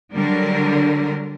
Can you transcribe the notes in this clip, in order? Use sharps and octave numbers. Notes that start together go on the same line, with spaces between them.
D3 F#3 G3 D4 A#4